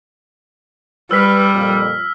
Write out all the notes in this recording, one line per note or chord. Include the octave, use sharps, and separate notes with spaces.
G3 B4 E6 F6 B6
F2 A#2